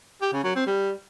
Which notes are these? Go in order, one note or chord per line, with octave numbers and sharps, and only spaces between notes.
G4
C#3
F#3
C4
G3